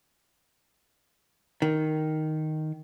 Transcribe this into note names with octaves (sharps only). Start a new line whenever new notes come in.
D#3